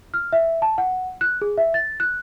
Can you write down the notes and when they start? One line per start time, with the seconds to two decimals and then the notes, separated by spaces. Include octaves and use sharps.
0.14 F6
0.33 E5
0.62 A5
0.78 F#5
1.21 F#6
1.42 G#4
1.58 E5
1.74 A6
2.00 F#6